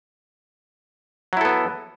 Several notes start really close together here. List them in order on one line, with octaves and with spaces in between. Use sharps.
F#3 E4 A4 B3